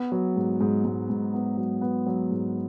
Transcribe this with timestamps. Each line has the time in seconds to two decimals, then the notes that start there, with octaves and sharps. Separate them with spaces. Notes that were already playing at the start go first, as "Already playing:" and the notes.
Already playing: B3
0.12 F#3
0.36 G#2
0.61 G#2
0.85 G#2
1.09 G#2
1.34 B3
1.57 F#3
1.81 B3
2.06 F#3
2.31 G#2